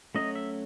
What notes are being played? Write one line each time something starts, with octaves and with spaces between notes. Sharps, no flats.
F#3 A3 C#4 D#5
E5